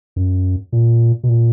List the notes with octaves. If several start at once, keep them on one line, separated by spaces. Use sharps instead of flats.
F#2
A#2
B2
A#2